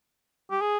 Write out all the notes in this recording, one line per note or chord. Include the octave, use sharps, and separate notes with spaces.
G4
G#4